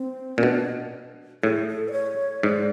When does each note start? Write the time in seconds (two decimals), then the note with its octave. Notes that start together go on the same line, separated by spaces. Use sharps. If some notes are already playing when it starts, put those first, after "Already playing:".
Already playing: C4
0.37 A#2 C#4
0.43 B2 D4
1.43 A2 G#4
1.68 A4
1.88 D5
1.93 C#5
2.43 G#2 D5